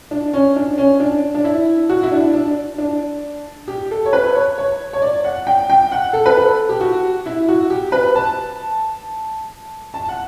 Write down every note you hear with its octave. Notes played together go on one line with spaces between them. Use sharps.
D4
C#4
D4
C#4
D4
D4
E4
F#4
E4
D4
D4
D4
G4
A4
C#5
B4
C#5
C#5
C#5
D5
F#5
G5
G5
F#5
A4
B4
A4
G4
F#4
E4
F#4
G4
B4
A5
A5
F#5